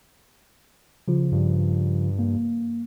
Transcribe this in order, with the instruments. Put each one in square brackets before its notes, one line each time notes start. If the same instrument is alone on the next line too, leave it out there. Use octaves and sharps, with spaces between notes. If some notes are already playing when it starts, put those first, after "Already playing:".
[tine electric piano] C#3 F3 F4
[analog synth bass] G2
[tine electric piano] A#3